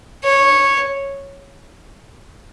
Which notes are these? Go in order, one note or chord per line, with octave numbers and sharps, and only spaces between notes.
C#5